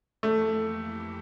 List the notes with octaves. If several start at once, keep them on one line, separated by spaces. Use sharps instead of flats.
F2 E3 A3 A#3 E4 G4